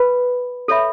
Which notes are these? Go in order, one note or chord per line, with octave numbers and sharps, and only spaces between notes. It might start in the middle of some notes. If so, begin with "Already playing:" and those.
Already playing: B4 B5
A4 C#5 E5 B5